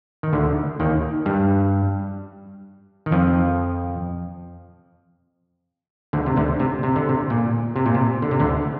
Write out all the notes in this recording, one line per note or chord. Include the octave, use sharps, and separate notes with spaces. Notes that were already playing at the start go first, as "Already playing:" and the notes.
D#3
D2 D3
D#2 D#3
G2 G3
D#3
F2 F3
D2 D3
C3
D2 D3
C3
C3
D3
C3
A#2
C3
A#2
C3
D3
C3
D2 D3